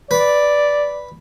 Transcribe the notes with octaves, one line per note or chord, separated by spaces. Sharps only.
B4 D5